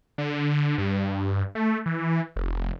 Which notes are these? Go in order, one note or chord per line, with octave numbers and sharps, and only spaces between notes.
D3
G2
A3
E3
F1